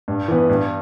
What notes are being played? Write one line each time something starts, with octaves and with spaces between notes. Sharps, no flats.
G2
E3 B3
G2